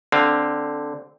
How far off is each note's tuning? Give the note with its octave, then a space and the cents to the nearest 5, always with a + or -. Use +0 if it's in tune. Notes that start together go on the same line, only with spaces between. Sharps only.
D3 +0 C4 +0 F5 +0